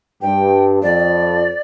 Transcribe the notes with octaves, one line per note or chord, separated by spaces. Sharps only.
G2 G5
F2 D5